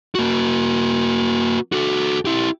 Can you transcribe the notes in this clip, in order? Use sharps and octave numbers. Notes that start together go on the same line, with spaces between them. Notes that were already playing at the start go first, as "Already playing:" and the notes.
A#3 F#4
F#4 A4
E4 G4